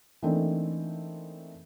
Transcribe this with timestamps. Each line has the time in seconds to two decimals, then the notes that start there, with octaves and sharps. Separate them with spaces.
0.22 E3 A3 A#3 C4 D4 D#4